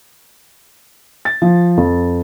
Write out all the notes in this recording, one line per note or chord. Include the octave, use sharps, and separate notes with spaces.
A6
F3
F2